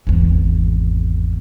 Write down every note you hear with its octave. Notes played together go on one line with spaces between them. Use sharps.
G#1 E2